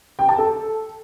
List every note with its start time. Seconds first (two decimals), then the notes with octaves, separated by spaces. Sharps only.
0.19 G5
0.29 A5
0.38 A4